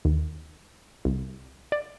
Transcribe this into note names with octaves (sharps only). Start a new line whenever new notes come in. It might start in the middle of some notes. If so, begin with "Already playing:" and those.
D#2
C2
D5